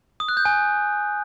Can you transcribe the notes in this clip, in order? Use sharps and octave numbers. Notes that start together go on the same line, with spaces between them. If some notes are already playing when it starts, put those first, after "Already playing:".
D#6
F#6
G6
G#5